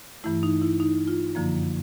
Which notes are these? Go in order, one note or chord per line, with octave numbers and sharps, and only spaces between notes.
G2 E3 A3 E4
D#4
E4
D#4
F4
F#2 D3 F3 A#3